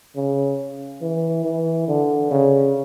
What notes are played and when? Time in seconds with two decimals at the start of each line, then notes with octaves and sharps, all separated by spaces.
0.16 C#3
1.02 E3
1.45 E3
1.88 D3
2.31 C#3